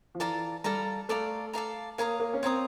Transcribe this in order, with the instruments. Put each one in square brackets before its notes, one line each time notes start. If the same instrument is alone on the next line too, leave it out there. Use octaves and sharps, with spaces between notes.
[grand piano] F3
[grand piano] E3 [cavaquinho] A4 D5 F5 A#5
[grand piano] G3 [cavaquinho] A4 D5 F5 A#5
[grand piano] A3 [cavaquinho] A4 D5 F5 A#5
[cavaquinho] A4 D5 F5 A#5
[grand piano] A#3 [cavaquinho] C#5 F5 A#5 D#6
[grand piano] A#3
C#4
[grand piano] C4 [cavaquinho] C#5 F5 A#5 D#6